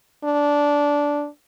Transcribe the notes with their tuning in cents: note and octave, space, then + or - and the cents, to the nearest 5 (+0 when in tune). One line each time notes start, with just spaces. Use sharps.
D4 -10